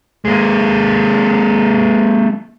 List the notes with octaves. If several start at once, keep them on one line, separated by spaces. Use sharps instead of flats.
G#3 A#3